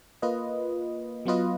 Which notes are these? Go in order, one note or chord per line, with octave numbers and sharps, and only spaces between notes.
A#3 F4 B4 D#5
F#3 B3 F4 B4 D#5